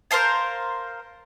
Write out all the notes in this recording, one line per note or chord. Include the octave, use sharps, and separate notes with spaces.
A#4 C5 F5 A5